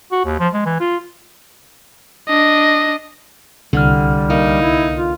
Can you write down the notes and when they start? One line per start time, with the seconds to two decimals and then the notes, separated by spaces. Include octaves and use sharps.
0.12 F#4
0.25 D#2
0.39 F3
0.53 G#3
0.66 E3
0.80 F4
2.28 D4 D#5
3.73 C2 D3 G3 F6
4.30 A#3 D#4
4.62 E4
4.95 F4